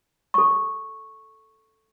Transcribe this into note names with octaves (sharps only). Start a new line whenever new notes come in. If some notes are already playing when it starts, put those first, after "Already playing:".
A4 C#6